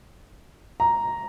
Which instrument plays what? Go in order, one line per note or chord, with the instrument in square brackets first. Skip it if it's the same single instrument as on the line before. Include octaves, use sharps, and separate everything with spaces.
[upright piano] A#5